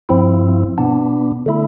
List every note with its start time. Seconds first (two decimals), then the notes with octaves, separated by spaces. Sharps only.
0.09 G2 F3 C4 E4
0.78 B2 B3 D4
1.46 D3 A3 E4